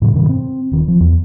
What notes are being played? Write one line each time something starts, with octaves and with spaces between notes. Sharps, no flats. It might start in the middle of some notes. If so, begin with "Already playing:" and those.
A2 C#3 F#3
G2 B2 D#3
C4
D#1 D#3 C4
F3
E2